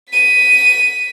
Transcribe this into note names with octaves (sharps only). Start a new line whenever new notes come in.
B6 D#7